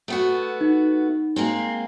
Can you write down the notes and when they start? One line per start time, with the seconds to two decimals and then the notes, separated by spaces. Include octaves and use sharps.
0.08 A3 B3 F#4
0.61 D#4
1.36 G#3 A#3 C4